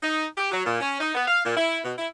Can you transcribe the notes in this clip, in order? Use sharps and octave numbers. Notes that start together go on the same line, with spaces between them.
D#4
G4
F#3
A#2
C#4
D#4
B3
F5
A#2
E4
B2
E4